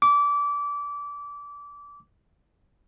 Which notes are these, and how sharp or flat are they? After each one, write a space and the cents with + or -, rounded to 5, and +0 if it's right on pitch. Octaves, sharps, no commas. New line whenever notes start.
D6 -25